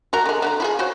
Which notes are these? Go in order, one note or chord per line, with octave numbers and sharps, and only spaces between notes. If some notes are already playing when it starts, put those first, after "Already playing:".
F#4 A#4 A#5
D3 G#3
D3 D#3 A#5
E4 F4 G#4
F#4 C5 C#5